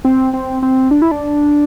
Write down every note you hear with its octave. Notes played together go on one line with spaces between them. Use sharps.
C4
C4
C4
D4
E4
D4